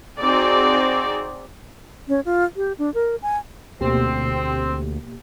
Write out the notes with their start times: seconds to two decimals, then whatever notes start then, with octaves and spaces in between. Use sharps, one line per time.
0.20 C4 D#4 F#4 G#4 D5
2.08 C#4
2.25 F4
2.56 G4
2.78 D4
2.94 A#4
3.22 G#5
3.81 D2 B2 A#3 C4 G4